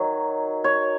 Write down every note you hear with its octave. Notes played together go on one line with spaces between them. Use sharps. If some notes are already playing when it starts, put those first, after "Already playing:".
Already playing: D#3 F#3 C#5
C#5